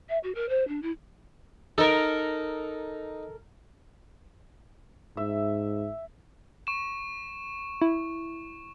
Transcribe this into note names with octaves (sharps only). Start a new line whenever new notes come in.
E5
F#4
A#4
C5
D4
E4
D#4 A4 A#4
G#2 E5
C#6 E7
E4